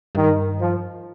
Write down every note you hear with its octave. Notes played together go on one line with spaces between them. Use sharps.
G2 D#3
F3